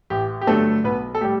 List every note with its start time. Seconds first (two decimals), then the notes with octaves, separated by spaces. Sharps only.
0.10 A1 G4
0.41 G4
0.47 G2 D3 F#3 A3 A4
0.84 B1 B3 B4
1.15 A4
1.21 A2 G3 G4